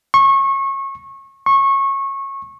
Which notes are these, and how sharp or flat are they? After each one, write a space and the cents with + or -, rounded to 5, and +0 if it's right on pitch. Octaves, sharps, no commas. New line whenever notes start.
C#6 -25
C#6 -20